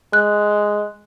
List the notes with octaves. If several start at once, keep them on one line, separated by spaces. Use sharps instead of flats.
G#3 F#6